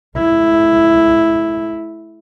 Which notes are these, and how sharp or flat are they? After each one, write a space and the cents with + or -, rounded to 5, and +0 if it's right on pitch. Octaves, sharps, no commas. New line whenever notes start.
A3 -35 E4 +0